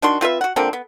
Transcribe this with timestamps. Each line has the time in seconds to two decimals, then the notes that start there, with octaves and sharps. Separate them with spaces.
0.02 D#3 D4 F#4 C6
0.21 C4 F4 B4 E5
0.41 F#4 F#5
0.56 D3 F3 A#3 C4
0.73 B3